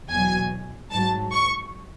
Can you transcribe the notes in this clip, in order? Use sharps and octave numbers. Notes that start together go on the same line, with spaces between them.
E2 B2 F#3 G#5
G#2 F#3 A5
C#6